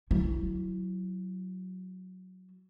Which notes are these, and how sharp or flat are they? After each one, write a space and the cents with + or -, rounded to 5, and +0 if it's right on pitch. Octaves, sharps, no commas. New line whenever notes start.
F#3 +0 E4 +10